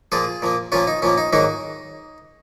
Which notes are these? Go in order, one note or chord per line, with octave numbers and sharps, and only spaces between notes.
A#2 F3 A#3 F4 G#4
A#2 F3 A#3
A#2 F3 A#3 C#4 F4
D#4
A#2 F3 A#3 C#4
D#4
G#2 D#3 F#3 A#3 D#4